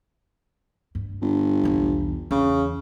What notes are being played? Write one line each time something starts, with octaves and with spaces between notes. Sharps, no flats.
G2
G1
B1 E2
E2 C#3